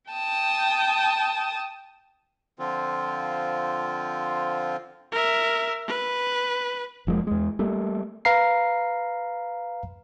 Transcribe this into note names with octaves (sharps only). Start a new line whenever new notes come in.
G5 A5 D#6
D3 F3 C4 F4
A#4 E5
B4
F1 F3 G#3 A#3
E2 G#3
G3 A3 A#3
B4 F5 A#5 C7